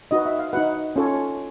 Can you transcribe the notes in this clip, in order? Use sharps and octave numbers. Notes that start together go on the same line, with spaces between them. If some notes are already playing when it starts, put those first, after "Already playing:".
D#4 F#4 B4 D#5
E5
F5
D#4 F#4 B4 F#5
C#4 F4 A4 C#5